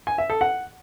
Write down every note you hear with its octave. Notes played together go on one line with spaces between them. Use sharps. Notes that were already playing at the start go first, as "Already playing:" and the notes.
G#5
E5
A4
F#5